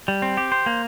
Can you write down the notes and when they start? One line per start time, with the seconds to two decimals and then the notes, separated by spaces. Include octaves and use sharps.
0.08 G3
0.22 C4
0.37 G4
0.52 C5
0.66 A#3